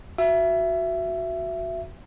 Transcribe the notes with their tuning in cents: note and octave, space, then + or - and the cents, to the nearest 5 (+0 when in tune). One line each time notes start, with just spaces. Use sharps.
F#4 +0 E5 +20